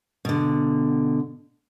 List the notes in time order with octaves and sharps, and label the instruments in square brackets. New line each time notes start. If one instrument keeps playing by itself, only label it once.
[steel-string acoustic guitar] B2 D3